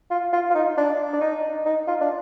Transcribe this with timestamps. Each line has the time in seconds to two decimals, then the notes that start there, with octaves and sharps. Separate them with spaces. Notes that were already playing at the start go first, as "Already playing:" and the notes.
0.11 F4
0.33 F4
0.50 F4
0.54 D#4
0.77 D4
1.13 D4
1.21 D#4
1.65 D#4
1.87 F4
2.01 D4